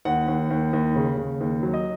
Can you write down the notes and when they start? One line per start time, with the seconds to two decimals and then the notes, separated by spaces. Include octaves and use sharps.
0.05 D#2 F#5
0.28 D#2
0.50 D#2
0.73 D#2
0.96 C#3
1.17 C#3
1.41 D#2
1.63 F#3
1.74 D#5